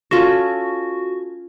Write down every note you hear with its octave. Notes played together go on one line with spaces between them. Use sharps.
C#4 F4 F#4 A4